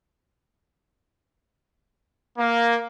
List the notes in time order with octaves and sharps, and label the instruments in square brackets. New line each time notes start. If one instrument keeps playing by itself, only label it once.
[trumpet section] A#3